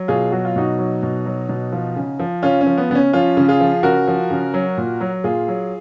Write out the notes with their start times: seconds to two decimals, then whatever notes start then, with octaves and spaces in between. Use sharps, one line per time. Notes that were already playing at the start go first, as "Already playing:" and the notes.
Already playing: F#3
0.08 B2 F4 G#4
0.32 F#3 F#4
0.45 F4
0.56 B2 D#4 F#4
0.79 F#3
1.03 B2
1.26 F#3
1.49 B2
1.72 F3
1.96 C#3
2.19 F3
2.43 C#3 C#4 F4
2.61 C#4
2.66 F3
2.78 B3
2.90 C#3 B3
2.95 C#4
3.13 F3 C#4 F4
3.37 C#3
3.48 F4 G#4
3.61 F3
3.83 C#3 F#4 A#4
4.07 F3
4.31 C#3
4.54 F#3
4.78 A#2
5.01 F#3
5.24 A#2 F4 G#4
5.48 F#3